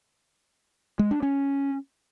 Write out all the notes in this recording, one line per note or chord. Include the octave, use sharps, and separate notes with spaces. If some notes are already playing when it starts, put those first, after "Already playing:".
G#3
D4
C#4